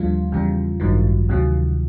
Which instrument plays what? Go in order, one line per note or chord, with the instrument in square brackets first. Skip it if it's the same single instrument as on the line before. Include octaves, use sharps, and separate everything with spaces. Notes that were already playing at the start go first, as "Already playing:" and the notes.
Already playing: [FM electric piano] D#2 D3 F3 G3 F4
E2 C#3 E3 G3
A1 G2 D#3 F#3
D2 C3 D#3 F#3